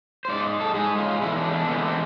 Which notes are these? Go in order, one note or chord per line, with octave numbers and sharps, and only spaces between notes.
C5
G#2 G#3 D5
A4
G#2 G#3 G#4
F4
E2 D3 G#3 E4
D4
D4
A3
E2 D3 G#3 B3
B3
C4